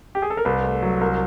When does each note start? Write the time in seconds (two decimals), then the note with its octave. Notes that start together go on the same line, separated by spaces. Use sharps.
0.15 G4
0.22 G#4
0.30 A4
0.37 A#4
0.45 C2 B4
0.64 A3
0.82 F#3
1.01 C2 A#4